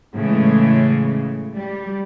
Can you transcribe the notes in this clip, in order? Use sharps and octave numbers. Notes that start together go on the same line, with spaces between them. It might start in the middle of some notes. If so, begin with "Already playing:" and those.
A2 C#3 E3 G#3
G3